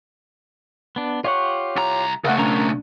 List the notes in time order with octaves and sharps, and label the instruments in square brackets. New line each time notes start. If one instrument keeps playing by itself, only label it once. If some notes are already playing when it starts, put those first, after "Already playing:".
[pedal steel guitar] B3 D4
[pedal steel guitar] F4 G4 F#5 [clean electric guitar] C#5
[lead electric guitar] C2 A#5
[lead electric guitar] C#3 A3 [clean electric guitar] A#4 E5 F#5
[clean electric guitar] B1 D4 [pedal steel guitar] C#4 A#4 A#5